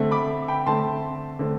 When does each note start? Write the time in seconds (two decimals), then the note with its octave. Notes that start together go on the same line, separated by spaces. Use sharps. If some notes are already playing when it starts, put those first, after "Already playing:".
Already playing: D3 A3 C4
0.11 B5 D6
0.48 G5 B5
0.66 D3 A3 C4 A5 C6
1.39 D3 A3 C4